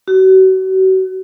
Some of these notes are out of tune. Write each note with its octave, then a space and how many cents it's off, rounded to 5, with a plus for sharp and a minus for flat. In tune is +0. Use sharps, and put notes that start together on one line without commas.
F#4 +35